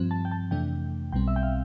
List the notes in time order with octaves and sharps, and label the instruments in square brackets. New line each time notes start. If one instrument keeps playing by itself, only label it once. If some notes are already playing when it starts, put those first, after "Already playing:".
Already playing: [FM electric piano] G2 F3 C4
A5
G5
A5
F2 C3 E3 A3 D4 G5
B1 B2 G3 C4 G5
E5
G5
F5